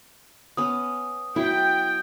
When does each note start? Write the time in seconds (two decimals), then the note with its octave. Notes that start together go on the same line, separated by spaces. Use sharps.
0.57 B3 C#4 D#6
1.36 F#3 E4 G5